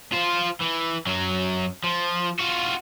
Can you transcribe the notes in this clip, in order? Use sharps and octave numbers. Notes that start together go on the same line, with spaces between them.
F4 C5
E3
F#2 F#3
F3
F4 F#4